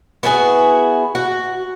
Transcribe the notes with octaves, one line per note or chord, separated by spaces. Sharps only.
B3 E4 F#4 G#4
F#4